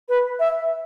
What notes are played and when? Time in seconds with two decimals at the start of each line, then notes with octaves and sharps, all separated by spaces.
0.09 B4
0.40 E5